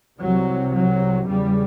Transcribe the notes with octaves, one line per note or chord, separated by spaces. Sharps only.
C2 C3 F#3
F#3
E2 C#3 G3